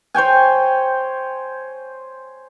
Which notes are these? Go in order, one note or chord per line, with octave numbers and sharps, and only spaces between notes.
C5 C#5 G5 G#5